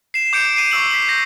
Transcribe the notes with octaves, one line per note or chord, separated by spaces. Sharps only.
C7 E7
D6 G6 C#7 D7
C7 D#7
C#6 D6 E6 F#7
B6 C7 F#7
G6 A#6